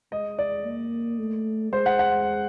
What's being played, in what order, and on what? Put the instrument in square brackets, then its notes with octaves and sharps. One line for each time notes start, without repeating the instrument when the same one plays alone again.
[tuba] G#3 [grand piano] D#5
[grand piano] D5
[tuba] A#3
A3
[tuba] G#3 [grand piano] C5
[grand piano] F#5
F#5